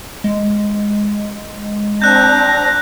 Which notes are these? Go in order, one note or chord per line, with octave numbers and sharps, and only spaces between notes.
G#3
C4 D4 A#5 F#6 G6